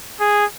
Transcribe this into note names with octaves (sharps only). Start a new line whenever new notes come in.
G#4